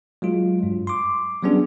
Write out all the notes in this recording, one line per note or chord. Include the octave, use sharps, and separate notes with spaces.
F#3 G#3 F4
G2
C6 D6
F#3 G3 B3 C#4 D4 G#4